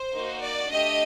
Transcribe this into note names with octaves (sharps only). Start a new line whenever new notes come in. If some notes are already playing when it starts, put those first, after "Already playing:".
Already playing: C5
A#3 D#4 F#4
D5
A3 D4 G4 D#5